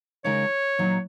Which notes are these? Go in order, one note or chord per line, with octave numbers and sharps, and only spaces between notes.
C#3 G#3 D#4 A#4 C#5
A#2 F#3 D#4